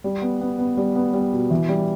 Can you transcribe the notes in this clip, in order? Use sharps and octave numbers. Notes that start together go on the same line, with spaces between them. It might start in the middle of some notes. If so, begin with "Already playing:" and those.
G3
B3
B3
B3
G3
B3
G3
B2
E3
G3